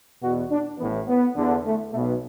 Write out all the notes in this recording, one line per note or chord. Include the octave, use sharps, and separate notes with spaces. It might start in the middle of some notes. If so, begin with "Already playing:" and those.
E2 B2 F#4
D4
A1 A2 E3 B3
B3
E2 D3
A3
B1 B2 A3